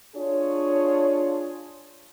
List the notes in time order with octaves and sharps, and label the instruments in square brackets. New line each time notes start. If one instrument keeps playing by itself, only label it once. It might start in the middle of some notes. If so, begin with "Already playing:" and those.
[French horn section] D4 F4 G#4 C#5